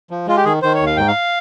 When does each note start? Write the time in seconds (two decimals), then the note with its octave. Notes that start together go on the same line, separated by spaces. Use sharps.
0.11 F3
0.27 G#3 F4
0.37 G4
0.45 D#3 G#4
0.62 D#3 C5
0.75 C#5
0.80 D#2
0.87 F5
0.97 G#2 G5
1.07 F5